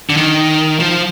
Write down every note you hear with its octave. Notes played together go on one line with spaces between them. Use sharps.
D3
D#3
F3